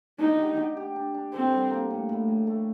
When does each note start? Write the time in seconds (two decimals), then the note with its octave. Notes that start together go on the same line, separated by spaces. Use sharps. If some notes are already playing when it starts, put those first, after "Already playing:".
0.19 D4 D#4
0.39 G4
0.57 G4
0.77 G4
0.96 D4
1.14 D4
1.33 C4 A4
1.52 G3
1.71 A#3
1.90 A2
2.09 A2
2.28 A2
2.47 A3